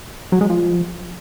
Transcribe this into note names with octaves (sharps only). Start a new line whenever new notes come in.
F#3
G#3
F3